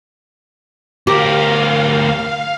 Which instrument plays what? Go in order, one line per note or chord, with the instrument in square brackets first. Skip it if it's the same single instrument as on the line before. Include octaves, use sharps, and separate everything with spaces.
[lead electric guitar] D2 A#4 [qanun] G4 [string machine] F5